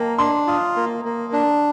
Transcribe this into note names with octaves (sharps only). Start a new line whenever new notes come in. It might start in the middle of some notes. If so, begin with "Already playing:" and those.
Already playing: A#3 G5 A5 A#5
D4 C6
F4 D#6
A#3
A#3
D4